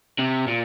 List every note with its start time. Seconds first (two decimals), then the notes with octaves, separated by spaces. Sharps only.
0.19 C3
0.48 A#2